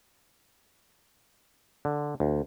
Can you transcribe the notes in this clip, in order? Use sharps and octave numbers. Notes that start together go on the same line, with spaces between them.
D3
D2